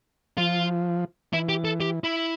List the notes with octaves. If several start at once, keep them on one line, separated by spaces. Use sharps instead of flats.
F3 F4
E3 E4
G4
A4
G4
E4